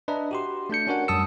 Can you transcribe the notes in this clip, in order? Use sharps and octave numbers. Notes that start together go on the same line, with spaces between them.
D4 B4 D#5 E5 A#5
F#4 G4 C6
A3 D4 G6 C#7
C#4 D4 F#4 A#4 C#5 F#5
F#2 G3 A5 D#6 E6 C#7